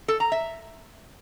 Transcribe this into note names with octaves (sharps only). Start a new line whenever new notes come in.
A4
A#5
E5